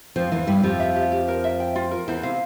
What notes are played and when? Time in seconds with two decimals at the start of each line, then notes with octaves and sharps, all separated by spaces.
0.16 F2 F3 C5
0.32 E2 E3 F5
0.47 G2 G3 E4
0.63 F2 F3 G4
0.80 E5
0.96 G4
1.12 G4
1.28 A#4
1.44 E5
1.60 G5
1.76 F4
1.91 A#4
2.08 E2 E3 C5
2.23 C3 F5